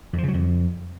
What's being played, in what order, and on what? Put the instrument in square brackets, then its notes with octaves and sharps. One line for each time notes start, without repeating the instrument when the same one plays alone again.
[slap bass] F2
F3
C#3
F#3
F2